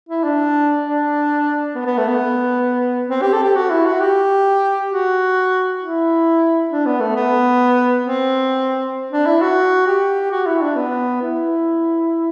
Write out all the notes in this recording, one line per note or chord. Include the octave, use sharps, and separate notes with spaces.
E4
D4
D4
B3
B3
A3
B3
C4
G4
A4
G4
F#4
E4
F#4
G4
F#4
E4
D4
B3
A3
B3
C4
D4
E4
F#4
G4
F#4
E4
D4
B3
E4